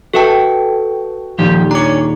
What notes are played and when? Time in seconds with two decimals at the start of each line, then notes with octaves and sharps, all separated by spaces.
0.13 F#4 A4 B4 E5 G5 A5
1.39 D#1 F3 G4
1.71 D4 C#5 A#5 D6